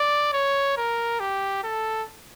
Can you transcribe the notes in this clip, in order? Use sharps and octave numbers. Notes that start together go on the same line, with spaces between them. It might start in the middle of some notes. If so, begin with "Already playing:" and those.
Already playing: D5
C#5
A#4
G4
A4